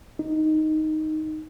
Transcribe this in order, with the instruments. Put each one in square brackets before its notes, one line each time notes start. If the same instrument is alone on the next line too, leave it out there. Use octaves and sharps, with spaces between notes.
[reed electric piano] D#4